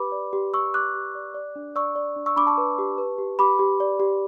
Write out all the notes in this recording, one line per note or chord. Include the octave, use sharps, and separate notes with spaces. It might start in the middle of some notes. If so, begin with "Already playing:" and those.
Already playing: G4 B4 B5 D6
D5
G4
G4 C#6 E6
G4 D6 F#6
G4
D5
D5
D4
D5 C#6 E6
D5
D4
C#6 E6
D4 B5 D6
A5 C#6
B4
G4
B4
G4
G4 B5 D6
G4
D5
G4